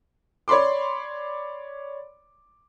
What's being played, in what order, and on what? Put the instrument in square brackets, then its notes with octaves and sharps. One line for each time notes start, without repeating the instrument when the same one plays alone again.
[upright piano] C#5 D5 B5 C6 D6